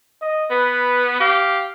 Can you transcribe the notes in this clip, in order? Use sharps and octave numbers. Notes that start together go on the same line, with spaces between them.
D#5
B3 B4
G4 F5